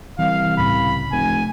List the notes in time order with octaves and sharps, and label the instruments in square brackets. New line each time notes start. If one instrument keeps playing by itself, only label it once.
[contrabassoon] C2 [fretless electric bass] E3 [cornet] F5
[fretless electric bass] C#2 A2 C#3 [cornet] B5
[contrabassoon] F1 [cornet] G#5